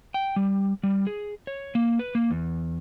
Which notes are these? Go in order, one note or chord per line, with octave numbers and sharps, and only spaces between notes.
G5
G3
G3
G#4
C#5
A#3
B4
A#3
E2